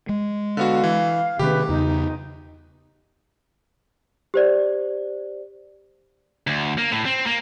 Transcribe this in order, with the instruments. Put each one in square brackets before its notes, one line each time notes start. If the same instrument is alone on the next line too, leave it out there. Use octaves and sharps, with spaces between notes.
[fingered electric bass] G#3
[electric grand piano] D3 B3 F#4 [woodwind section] F5
[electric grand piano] E3
[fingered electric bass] C3 D#3 C#4 [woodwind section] A3 G#4 B4 [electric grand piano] G4
[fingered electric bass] E2 C#3 B3 [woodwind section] D#4
[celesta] G4 C5 D5
[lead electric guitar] D2
A#3
A2
C4
A#3